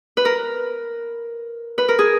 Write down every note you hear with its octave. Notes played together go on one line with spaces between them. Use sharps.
B4
A#4
B4
A#4
G#4